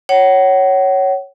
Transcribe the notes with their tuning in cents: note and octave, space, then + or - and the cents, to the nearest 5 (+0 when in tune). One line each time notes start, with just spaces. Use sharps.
C#5 +0 F#5 +35